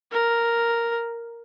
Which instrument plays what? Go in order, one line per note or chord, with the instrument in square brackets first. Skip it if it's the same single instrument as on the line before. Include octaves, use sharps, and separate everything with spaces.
[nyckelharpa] A#4